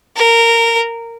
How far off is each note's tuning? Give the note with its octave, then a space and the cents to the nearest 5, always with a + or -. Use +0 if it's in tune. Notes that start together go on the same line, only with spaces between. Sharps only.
A#4 -15